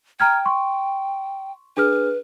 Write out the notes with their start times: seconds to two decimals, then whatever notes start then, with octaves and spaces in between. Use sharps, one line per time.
0.20 G5 A#5 F6 G#6
0.46 C6 C#6
1.77 D4 G#4 B4 F6